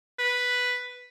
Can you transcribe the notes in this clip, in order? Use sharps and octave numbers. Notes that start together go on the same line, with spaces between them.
B4